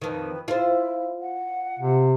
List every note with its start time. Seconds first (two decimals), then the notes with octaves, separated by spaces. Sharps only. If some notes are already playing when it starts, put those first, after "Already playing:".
0.02 F2 D#3 B4
0.48 E4 F4 C5
1.20 F#5
1.79 C3